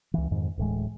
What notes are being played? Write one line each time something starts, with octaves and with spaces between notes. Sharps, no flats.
C#2 E3
F2 G#2 D#3
D1 A2 E3 G#3